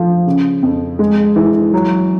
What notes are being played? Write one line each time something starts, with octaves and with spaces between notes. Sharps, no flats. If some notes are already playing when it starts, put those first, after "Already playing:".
Already playing: F3 A3
C#3
F2
G#3
E3
F#3